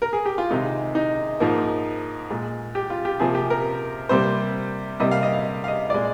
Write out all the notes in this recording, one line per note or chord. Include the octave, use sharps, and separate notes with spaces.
A#4
G#4
G4
F4
C3 D#3 G#3 D#4
D#4
G#2 F3 A#3
A#2 G#3
G4
F4
G4
C3 F3 A#3 G#4
G4
A#4
C3 G3 A#3 C5
C3 G3 A#3 D#5
F5
D#5
F5
F5
D#5
A#2 G#3 D5